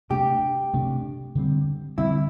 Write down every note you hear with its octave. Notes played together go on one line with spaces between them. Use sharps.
C3 A3 D4 G4
C3 A3 D4
D3 G3 C4
D3 G3 C4 E4